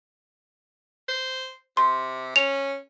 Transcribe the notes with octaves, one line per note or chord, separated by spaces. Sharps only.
C5
C3 C6
C#4 F7